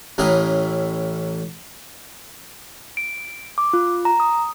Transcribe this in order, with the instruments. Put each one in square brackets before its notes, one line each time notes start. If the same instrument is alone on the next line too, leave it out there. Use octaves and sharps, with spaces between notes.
[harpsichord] A1 A2 E3 C#4 A#4 D#6
[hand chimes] D7
D6
F4
A#5
D#6